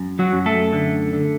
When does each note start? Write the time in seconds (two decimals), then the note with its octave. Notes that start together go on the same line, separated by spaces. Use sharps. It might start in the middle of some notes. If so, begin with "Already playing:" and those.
Already playing: F#2
0.19 F#3 F#4
0.33 F#2
0.46 A3 A4
0.73 D3
1.13 D3